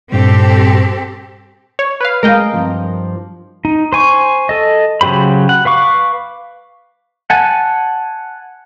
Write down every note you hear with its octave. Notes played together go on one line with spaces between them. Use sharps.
G2 A#2 G3 C4 G4 A4
C#5
B4 F5
G#3 G#4 A#4 D#5 F5 G5
G2 F3 C4
D#4
C5 G#5 C#6
A4 D#5
C#3 F#3 G4 C5 B5
F#5
B4 F5 C#6 D6
F#5 G#5 A5